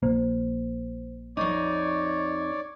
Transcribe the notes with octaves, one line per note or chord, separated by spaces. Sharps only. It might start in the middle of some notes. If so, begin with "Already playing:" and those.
A#1 A#3 C5
F2 D#4 C#5 D5 C#6 D6